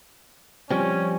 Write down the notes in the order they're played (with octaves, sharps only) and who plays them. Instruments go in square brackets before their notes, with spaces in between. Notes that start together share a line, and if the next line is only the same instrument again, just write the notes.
[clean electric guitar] F3 G3 C4 [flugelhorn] C#4